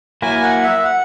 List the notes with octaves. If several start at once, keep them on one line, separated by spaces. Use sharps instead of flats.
F#3 A#3 E4 A#4 G#5
F#5
E5
F#5